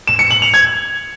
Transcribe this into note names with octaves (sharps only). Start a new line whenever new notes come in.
E7
C#7
F#7
F7
G#6